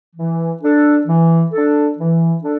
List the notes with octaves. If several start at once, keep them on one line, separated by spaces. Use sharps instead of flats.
E3
D4 A4
E3
D4 A4
E3
D4 A4